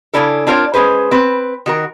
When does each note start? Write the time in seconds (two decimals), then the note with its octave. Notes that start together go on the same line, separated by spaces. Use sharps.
0.13 C#3 G3 C#4 D4 E4 A4
0.47 C4 D4 F4 A#4 C5 C#5
0.74 G#3 C#4 G#4 B4 C5
1.11 C4 B4
1.66 D#3 F#4 A#4